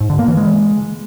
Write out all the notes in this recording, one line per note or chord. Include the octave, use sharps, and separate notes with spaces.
G#2
D3
A#3
E3
G#3